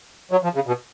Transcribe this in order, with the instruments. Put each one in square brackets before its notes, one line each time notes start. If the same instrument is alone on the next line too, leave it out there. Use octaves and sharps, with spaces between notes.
[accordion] F#3
F3
C#3
B2